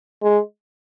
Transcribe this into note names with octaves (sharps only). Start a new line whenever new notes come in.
G#3